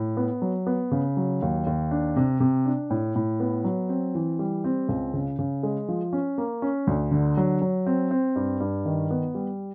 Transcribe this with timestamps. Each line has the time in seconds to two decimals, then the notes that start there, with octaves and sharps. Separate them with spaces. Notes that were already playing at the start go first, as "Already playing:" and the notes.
Already playing: A2
0.17 B3
0.42 F#3
0.67 B3
0.91 C#3
1.17 F#3
1.42 D#2
1.66 D#2
1.91 D4
2.16 C3
2.40 C3
2.66 D4
2.90 A2
3.15 A2
3.40 B3
3.64 F#3
3.89 C4
4.15 E3
4.39 G3
4.64 C4
4.89 C#2
5.14 C#3
5.39 C#3
5.63 G#3
5.89 F3
6.13 C#4
6.38 A#3
6.62 C#4
6.87 D2
7.11 D3
7.37 F#3
7.62 F#3
7.86 C4
8.11 C4
8.36 G2
8.60 G2
8.86 D#3
9.11 B3
9.35 G3